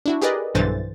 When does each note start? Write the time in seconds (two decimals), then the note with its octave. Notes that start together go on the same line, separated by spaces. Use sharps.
0.06 D4 E4 F#4
0.22 G4 G#4 A#4 B4 D5 D#5
0.55 B1 G2 D3 E3 C5 A6